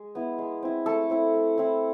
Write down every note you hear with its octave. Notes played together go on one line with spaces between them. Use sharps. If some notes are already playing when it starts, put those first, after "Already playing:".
Already playing: G#3
B3 E4
G#3
C4 E4
A3 A4
C4 E4
A3
C4 E4